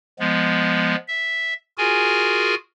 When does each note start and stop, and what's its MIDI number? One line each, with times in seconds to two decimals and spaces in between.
0.19 0.96 53
0.19 0.96 56
0.19 0.96 59
1.08 1.54 76
1.78 2.55 65
1.78 2.55 66
1.78 2.55 68
1.78 2.55 70
1.78 2.55 80